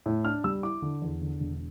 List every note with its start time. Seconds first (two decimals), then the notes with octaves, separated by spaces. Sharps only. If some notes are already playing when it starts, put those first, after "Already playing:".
0.06 A2
0.25 D4 F6
0.44 G3 E6
0.63 E4 D6
0.82 D3
1.02 E2
1.21 D3
1.40 E1